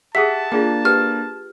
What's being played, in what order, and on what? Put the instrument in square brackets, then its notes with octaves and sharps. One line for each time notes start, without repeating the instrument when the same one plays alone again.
[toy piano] G4 G#4 [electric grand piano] E5 F#5 D#6 [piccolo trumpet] A5 [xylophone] B6
[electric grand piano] A#3 D4 [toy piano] F4 G#4 G5
[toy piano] G4 B4 G5 [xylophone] F6